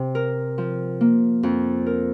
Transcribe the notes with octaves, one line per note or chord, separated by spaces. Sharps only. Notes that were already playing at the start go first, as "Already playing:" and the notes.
Already playing: C3
A#4
F3
A#3
F2
A#4